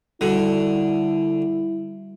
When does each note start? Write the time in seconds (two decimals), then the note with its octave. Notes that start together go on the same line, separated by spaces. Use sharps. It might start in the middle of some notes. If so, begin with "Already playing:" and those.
0.21 D3 G3 E4 F#4